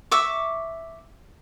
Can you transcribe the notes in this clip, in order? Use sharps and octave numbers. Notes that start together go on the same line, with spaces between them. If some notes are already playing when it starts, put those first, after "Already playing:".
E5 C#6 D6